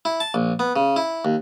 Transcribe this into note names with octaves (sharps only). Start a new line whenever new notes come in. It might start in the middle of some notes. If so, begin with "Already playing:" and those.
E4
A5
A#1
B3
C#3
E4
D#2